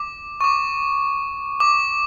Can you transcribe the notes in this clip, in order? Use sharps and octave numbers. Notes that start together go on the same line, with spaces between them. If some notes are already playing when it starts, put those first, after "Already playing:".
Already playing: D6
C#6
D6
D6